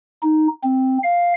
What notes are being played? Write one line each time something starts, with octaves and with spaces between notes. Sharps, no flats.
D#4
C4
F5